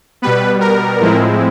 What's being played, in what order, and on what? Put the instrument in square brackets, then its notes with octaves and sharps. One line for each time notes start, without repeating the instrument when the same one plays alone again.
[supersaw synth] B2 G3 B3 B4
A#4
A2 F3 G#3 C4 E4